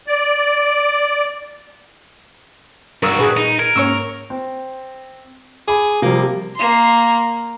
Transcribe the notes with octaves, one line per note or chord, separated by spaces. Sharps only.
D5
G2 F#4 A#4 D5 C#6 D#6 E6
A#2 G#4 B4
D#4
A#4 G#6
G#2 A#3 C#4 C#5 C#6 E6
C4
G#4 B5 D6
C3 F3 G3 A#3
A#3 C6